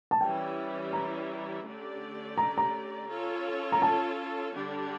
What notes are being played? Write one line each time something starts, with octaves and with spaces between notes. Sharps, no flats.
A5
E3 G3 C#4 E4 G5
A#5
D3 A3 C#4 G4 D5
A#5
A#5
C#4 F4 A4 C#5
A#5
A5
D3 G3 D4 G4